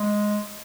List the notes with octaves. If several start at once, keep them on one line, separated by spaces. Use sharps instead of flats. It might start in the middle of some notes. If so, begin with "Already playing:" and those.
Already playing: G#3